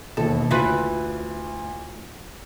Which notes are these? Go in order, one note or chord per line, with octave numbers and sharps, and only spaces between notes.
E1 D#2 D#3 A4
D2 E4 F4 B4